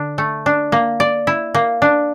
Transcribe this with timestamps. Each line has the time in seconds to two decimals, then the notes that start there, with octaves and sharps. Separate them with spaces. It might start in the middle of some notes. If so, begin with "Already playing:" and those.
Already playing: D3 D4
0.18 A3
0.46 D4
0.72 A#3
1.00 D5
1.27 E4
1.55 A#3
1.82 D4